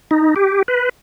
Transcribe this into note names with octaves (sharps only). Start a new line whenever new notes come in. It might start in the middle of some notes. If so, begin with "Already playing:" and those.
D#4
G4
B4